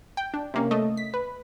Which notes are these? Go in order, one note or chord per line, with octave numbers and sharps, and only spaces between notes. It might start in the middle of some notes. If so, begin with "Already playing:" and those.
G5
D4
C3 A#3 C#4
A3 D#5
B6
B4